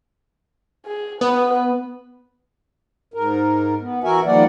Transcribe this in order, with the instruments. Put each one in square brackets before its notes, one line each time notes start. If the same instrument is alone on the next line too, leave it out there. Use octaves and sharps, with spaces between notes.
[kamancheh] G#4
[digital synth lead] B3 [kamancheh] B4
[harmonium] G#2 A#4
B3
E3 F#4 A#4 E5 G#5
D#3 F3 G3 A#3 D5 F#5